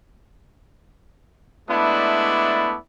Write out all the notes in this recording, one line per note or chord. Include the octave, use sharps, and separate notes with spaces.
G#3 A3 B3 D4 E4 D5